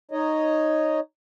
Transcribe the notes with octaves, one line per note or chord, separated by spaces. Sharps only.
D#4 C#5 D#5